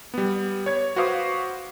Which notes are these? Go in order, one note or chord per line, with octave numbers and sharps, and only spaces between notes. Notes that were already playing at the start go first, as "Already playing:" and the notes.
G3 B3
C#5 G#6
F#4 B4 C5 F5 D6 D#6